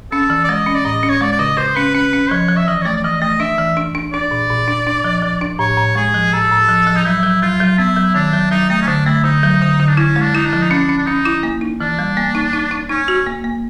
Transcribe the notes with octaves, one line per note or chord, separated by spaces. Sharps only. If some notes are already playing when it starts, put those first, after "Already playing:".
C#4 A4
E3
D5
G#3 D#5
C#4
D5
A2 D#5
C#4
C#5
G#3 D5
D5
C#3 D#5
C#3 C5
C#4 B4
C#4 B4
C#4
F3 C#5
F3
E5
E3 D#5
C#5
A3 D5
D5
E3 D#5
A3 D#5
D4 E5
E3
D4
D4
D4 D5
A#2
A#2
D4
D4
F3
F3
D4
A2 C#5
A2
G#3 G#4
F3
A2 A4
A2
F3
F3
D#4
F#3 E4
F#3
F#3 F4
F#3
B3 E4
F#3
D#3 D4
F#3
F#3 D#4
A3 D#4
C#4
D3 D4
A3 E4
D3 D#4
F#3
D3
D3
D4
C#4 E4
G#3
D4
D#4 E4
D4
F3
D#4
C#4 D4
C#4
D4
C#4 D#4
E4
A#3
D#4
E3 D4
G3
A#3
D#4
D#4
D#4
C#4 D#4
F#4
A#3
A#3